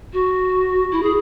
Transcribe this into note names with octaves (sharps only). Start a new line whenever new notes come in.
F#4
E4
G#4